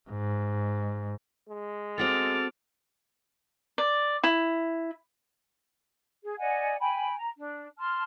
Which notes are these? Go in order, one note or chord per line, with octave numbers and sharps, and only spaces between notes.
G#2
G#3
C4 F#4 A4 D6 F6 A6
D5
E4
G#4
D5 D#5 F#5 G#5
G5 G#5 B5
A#5
D4
A5 C6 F6